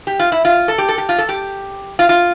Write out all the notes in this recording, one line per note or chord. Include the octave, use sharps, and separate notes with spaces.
G4
F4
E4
F4
A4
G4
A4
G4
F4
A4
G4
F4
F4